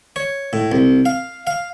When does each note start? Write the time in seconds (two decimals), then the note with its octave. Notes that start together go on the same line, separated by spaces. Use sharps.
0.16 C#5
0.53 A2
0.72 C2
1.05 F5
1.47 F5